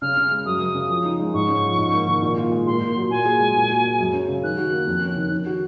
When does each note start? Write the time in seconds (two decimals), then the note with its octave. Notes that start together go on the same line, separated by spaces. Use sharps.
0.02 C#3 F6
0.17 C#3
0.31 G#3
0.45 F#2 D#6
0.60 F#2
0.75 C#3
0.89 F3
1.05 D#4
1.20 G#3
1.34 G#2 C#6
1.48 C#4
1.64 F3
1.78 G#2
1.92 A#3
2.08 D#3
2.22 A#2
2.37 F4
2.52 G#3
2.66 A#2 C6
2.81 A#2
2.96 F#3
3.10 A#2 G#5
3.25 G#4
3.40 G#3
3.55 A#2
3.70 F#4
3.84 G#3
3.99 F#2
4.14 C#4
4.28 C#3
4.43 D#3 F#6
4.57 F#4
4.72 A#3
4.88 F2
5.02 C#4
5.17 D#3
5.31 D#3
5.46 F#4